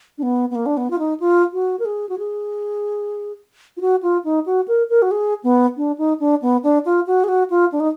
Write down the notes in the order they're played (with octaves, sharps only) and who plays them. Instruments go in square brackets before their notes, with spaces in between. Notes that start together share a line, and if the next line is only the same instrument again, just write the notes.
[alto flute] D4
B3
B3
A#3
D4
B3
F4
D#4
F4
F#4
A#4
G#4
F#4
G#4
F4
F#4
F4
D#4
F#4
A#4
A#4
F#4
G#4
B3
D4
D#4
D4
B3
D4
F4
F#4
G#4
F#4
F4
D4
D#4